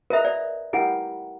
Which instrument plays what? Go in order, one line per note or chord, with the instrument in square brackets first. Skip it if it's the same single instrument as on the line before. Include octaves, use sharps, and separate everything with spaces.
[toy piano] A#4 E5 [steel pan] B4 D#5 A#5
[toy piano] D5 [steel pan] A#5
[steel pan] E4 G4 A#4 [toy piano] F#5 G#5